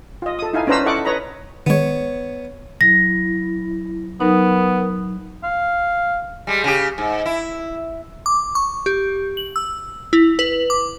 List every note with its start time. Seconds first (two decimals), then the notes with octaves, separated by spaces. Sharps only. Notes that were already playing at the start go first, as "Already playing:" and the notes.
0.22 F4 D#5
0.39 A4 D#6
0.53 D#4 E4 F5 G#5
0.67 C#4 D4 B4 C5 A#5 E6
0.86 E4 A4 D#5 F#5 C#6 D6
1.05 B4 C#5 D#5 A#5 B5
1.66 D#3 G#3 B3 C#5
2.81 F#3 E4 A#6
4.20 F#3 B3 D#4 A#4
5.43 F5
6.47 G3 G#3
6.64 C#3 G4
6.98 G#2
7.26 E4
8.26 D6
8.55 C#6
8.86 G4
9.37 F#7
9.56 E6
10.13 E4
10.39 B4
10.70 D6